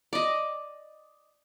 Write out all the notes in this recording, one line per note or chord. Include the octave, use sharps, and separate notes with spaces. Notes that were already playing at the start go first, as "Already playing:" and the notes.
D5 D#5